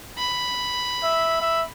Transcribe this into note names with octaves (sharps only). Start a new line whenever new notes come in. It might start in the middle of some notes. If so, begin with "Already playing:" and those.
B5
E5
E5